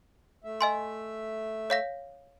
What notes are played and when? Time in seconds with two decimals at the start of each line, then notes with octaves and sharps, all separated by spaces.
0.44 A3 E5
0.61 D#5 G#5 C6
1.70 C#5 F5 A#6